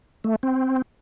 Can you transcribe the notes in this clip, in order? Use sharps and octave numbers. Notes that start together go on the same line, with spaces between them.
A3
C4